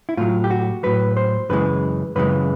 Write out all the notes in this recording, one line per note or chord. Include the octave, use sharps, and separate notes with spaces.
E4
A2 F#3 F4
G4
F#4
A2 F#3 B4
C5
F#2 C#3 E3 G#3 B4
F#2 C#3 E3 G#3 B4